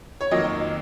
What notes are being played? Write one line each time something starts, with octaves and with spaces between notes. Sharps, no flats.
C#5
F2 D#3 F#3 A#3 D#5